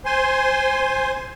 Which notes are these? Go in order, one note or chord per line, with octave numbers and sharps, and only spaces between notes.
C5 G#5 C6